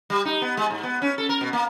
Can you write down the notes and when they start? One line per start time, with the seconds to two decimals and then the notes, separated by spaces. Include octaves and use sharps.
0.10 G3
0.25 D#4
0.41 B3
0.57 G#3
0.70 G#2
0.83 B3
1.02 C#4
1.18 A4
1.29 A#4
1.41 B2
1.53 A#3